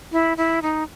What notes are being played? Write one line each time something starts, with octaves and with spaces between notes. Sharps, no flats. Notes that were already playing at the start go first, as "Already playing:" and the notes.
E4
E4
D#4